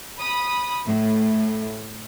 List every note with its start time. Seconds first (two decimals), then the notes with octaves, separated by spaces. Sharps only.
0.19 B5 D#6
0.86 A2